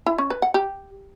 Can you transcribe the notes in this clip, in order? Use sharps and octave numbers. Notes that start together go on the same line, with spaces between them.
E4
C#4
B4
F#5
G4